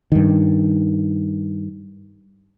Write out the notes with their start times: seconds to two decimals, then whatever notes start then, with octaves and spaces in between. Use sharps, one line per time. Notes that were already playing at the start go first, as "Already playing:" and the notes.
0.12 G2 D#3